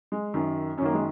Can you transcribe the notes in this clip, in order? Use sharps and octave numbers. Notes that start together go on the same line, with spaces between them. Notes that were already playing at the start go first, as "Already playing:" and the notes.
G#3
F#2 D#3
F#2 D#3 A#3 C#4
G#3